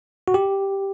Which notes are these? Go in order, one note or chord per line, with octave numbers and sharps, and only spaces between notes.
F#4
G4